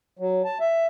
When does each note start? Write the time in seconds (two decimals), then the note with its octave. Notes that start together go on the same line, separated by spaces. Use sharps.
0.19 F#3
0.44 A5
0.60 E5